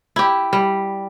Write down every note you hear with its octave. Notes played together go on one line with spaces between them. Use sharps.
E4 G4
G3